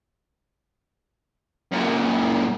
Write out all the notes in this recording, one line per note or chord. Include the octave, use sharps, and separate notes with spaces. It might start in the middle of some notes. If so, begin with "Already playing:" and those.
F#2 A#2